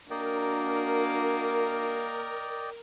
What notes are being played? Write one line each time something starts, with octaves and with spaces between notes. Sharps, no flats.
A#3 D4 F#4 A#4 D5 D#5 G5